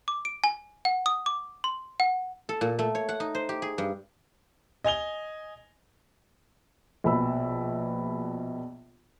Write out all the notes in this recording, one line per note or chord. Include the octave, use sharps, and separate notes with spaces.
D6
D7
G#5
F#5
D#6
D6
C6
F#5
A4
A#2
A3
C#5
F#5
D#4
C5
G4
G#4
G2
D#5 G#5 F7 G7
A#1 B2 B5 E6